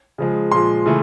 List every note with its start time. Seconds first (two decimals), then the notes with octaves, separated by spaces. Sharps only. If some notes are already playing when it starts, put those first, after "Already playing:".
0.18 C#3 F3 G#3
0.52 A#2 F3 G#3 C6
0.86 C#3 E3 A3